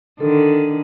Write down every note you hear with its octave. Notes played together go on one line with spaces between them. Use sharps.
D3 D#3 A4